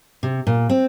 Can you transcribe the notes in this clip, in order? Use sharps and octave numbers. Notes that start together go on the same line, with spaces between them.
C3
A#2
C4